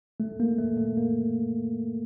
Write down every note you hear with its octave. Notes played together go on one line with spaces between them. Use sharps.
A3
A#3
A3
A3
A#3